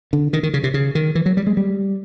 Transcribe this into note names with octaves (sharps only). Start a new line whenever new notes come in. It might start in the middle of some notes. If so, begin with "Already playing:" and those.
D3
D#3
D#3
C#3
C3
C#3
D#3
E3
F#3
G3
G#3
G3